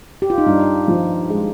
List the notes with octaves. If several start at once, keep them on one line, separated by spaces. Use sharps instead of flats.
G4
F4
D#4
G2 D4
F3
G#3